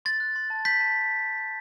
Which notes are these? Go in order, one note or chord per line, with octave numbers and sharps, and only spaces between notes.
C6 A6
F#6
C6
A5
C6 G6 B6
A5